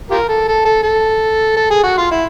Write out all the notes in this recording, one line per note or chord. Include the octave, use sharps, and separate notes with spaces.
F4 G4 A#4
A4
A4
A4
A4
A4
G#4
F#4
F4
E4